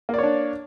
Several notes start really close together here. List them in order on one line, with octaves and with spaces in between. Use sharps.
A#3 D5 C#5 D4